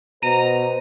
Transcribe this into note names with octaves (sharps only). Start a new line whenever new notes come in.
B2 B4 C5 A#5 D#7